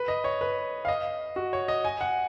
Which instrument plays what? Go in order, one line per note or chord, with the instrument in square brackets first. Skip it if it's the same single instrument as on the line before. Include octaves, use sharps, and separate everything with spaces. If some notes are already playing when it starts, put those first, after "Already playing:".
Already playing: [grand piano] B4
D#5
C#5
B4
F5
D#5
F#4
C#5
D#5
G#5
F#5